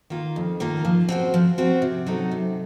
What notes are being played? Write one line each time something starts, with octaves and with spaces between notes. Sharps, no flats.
D#3 A#3 F4
F2
D#3 A#3 F4
F3
C4 F#4 C5
F3
C4 F#4 C5
C3
F#3 C4 D#4 A4
C3